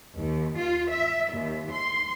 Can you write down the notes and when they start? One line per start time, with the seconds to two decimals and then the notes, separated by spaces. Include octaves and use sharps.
0.17 D#2
0.57 F4
0.91 E5
1.32 D#2
1.72 C6